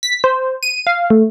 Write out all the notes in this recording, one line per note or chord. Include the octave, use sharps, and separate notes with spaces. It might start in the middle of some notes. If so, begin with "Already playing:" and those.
B6
C5
D#7
F5
A3